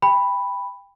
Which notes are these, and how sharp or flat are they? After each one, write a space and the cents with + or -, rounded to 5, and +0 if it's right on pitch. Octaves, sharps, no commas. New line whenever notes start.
G5 +25 B5 +0